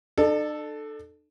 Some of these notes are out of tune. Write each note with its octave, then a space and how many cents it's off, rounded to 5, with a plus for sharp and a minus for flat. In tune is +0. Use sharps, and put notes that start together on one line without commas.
D4 +45 A4 +0